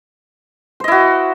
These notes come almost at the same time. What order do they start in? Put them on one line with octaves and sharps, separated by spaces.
C5 D#5 E4 F#4